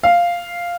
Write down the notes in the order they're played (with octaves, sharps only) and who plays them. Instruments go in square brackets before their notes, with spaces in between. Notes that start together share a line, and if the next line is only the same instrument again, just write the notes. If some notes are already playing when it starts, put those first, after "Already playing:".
[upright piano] F5